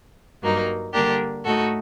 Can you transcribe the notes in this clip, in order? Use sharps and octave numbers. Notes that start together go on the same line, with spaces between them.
G2 F#3 A#3 D#4
D3 G3 A#3 D4 G4 A#4
A2 A3 D#4 F#4 A4